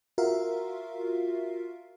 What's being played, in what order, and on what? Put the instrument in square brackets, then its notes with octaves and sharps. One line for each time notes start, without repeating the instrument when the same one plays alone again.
[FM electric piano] F4 F#4 A#4 E5 F5